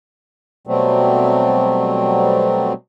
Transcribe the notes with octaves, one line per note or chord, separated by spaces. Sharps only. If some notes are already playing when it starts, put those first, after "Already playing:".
B2 F#3 G3 A3 C4